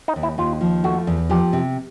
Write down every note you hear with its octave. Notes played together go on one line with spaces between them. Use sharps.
D#4
D#2
E4
D#2 F4
F3
A3 F#4
E2
F3 G4
C3